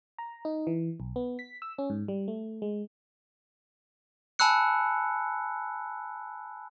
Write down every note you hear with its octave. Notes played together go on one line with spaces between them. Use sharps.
A#5
D#4
E3
B1
B3
B6
E6
C#4
G#2
G3
A3
G#3
G#5 A5 B5 E6 F#6 C#7